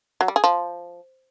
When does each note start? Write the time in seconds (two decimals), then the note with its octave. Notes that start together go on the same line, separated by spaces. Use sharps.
0.21 F#3
0.28 G3
0.36 G#4
0.44 F3